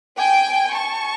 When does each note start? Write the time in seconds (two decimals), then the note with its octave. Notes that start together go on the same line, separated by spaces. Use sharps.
0.18 G5 G#5
0.74 A5 C#6